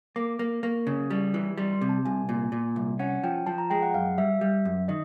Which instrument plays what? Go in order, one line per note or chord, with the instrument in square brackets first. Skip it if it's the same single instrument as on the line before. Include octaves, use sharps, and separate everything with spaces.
[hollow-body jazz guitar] A#3 [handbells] D6
[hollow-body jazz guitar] A#3
[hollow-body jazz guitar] A#3 [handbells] C#6
[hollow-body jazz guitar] C#3
G3
E3
[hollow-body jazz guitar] G3 [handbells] C6
[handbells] C6
[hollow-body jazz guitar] C3
[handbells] A5
[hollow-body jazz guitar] C2 [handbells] G#5
[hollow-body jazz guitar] A#2
A#2
C2
[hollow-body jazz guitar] C#4 [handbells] F#5
[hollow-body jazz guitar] F3 [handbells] G5
[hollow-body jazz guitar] F3 [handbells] A5
[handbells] A#5
[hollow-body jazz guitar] G#3 [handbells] G5
[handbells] F#5
[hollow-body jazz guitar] F#2 [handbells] F5
[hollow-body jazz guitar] G3 [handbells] E5
[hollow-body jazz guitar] G3
F#2
[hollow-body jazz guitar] D#3 [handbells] D#5